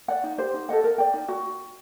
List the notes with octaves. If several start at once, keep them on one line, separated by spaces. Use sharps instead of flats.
D5 F#5
D#4
G4 C5
D#4
A4 D#5 F#5
A#4
D5 G5
D#4
F#4